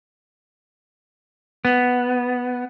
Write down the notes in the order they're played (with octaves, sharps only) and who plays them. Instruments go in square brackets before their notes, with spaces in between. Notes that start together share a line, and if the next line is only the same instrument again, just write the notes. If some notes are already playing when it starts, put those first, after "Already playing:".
[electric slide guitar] B3